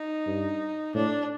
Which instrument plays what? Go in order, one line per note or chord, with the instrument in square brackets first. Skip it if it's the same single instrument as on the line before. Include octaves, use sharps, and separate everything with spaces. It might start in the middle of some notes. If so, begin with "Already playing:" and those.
Already playing: [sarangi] D#4
[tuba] G2
[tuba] A2 [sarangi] D4